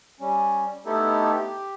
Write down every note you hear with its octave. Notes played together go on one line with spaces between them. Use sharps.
G3 C#4
A3 B3 D#4 E4 G4 A4
G4